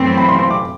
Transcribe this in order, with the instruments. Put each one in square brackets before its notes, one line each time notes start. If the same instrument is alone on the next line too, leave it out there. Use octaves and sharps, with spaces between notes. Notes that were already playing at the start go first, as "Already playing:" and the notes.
Already playing: [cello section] F#2 E3 A3 C4
[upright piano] B5
C6
C6
D6